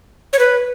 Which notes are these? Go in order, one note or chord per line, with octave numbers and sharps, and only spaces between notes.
C#5
B4